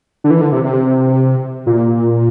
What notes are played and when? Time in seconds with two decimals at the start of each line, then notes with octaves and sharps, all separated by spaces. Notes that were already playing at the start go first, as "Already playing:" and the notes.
0.24 D3
0.30 E3
0.41 D3
0.52 C3
0.64 C3
1.67 A#2